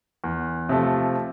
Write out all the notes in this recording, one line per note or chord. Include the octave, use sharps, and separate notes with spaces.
E2
C3 F3 A3